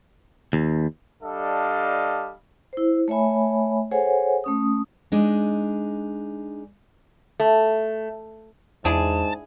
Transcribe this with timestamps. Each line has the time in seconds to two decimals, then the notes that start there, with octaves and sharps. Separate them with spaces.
0.53 D#2
1.22 G3 D4 A4 D#5 F5
2.73 E4 C5
3.08 A3 C#5 E5 G#5 B5
3.91 G#4 A4 C5 C#5 F#5 G#5
4.44 A3 C#4 D#6
5.12 G#3 D4 D#4
7.40 A3
8.85 E2 G#2 D4 E4 G#4 A5